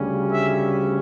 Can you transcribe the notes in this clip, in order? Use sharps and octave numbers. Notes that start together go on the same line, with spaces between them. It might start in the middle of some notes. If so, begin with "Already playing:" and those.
Already playing: D2 C#3 G3 C#4
E5